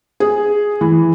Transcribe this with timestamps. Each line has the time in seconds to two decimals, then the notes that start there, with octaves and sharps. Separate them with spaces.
0.20 G#4
0.81 E3